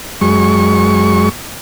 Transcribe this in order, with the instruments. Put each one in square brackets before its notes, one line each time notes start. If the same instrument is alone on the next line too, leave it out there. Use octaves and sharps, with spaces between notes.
[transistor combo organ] F#2 G#3 C#6